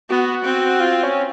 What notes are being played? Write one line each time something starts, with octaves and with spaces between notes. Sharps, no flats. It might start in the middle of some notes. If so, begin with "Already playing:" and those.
B3 F#4
C4
F4
C#4